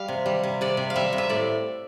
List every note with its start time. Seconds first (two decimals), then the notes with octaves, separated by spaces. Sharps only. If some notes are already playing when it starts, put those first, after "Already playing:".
Already playing: G3 F5
0.08 C3
0.26 G3
0.43 C3
0.61 C3 D5
0.77 C3
0.90 F5
0.95 G3 E5
1.13 C3
1.18 E5
1.29 A2 D5